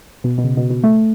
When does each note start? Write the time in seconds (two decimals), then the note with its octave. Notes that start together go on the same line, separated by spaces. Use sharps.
0.24 B2
0.38 B2
0.44 C#3
0.57 B2
0.70 B2
0.84 A3